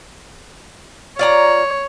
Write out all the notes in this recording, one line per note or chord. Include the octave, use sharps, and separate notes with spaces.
F4 C#5 D5 A#5